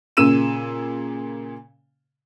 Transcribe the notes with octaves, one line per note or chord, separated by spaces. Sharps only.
A#2 C#3 E6 D#7 E7